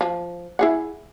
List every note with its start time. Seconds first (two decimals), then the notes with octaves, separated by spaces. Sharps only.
0.01 F3
0.59 E4 G#4 F#5